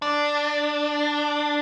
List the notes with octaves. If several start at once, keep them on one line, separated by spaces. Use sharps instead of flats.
D4